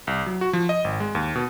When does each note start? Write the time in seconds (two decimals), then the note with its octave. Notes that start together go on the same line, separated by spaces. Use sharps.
0.07 C2
0.26 F#3
0.41 F#4
0.53 F3
0.69 D#5
0.84 G#1
1.00 G#3
1.15 D#2
1.35 B2